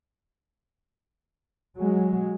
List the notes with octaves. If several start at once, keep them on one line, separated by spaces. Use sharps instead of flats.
F#3 G#3